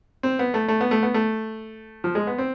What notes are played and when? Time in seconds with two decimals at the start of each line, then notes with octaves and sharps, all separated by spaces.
0.23 C4
0.39 B3
0.54 A3
0.68 A3
0.81 B3
0.91 A3
1.03 B3
1.14 A3
2.04 F3
2.15 G#3
2.27 B3
2.38 C4